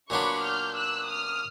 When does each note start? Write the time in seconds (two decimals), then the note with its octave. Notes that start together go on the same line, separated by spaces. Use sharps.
0.10 A#2 F#3 B3 D4 B5 C#6
0.43 F6 G6
0.76 E6 F#6
1.08 D#6 F6